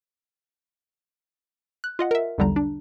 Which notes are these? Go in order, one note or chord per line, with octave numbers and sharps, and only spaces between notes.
F#6
F4 D#5 F#5
A#4 E5
B1 E2 D3 G3 A#5
D4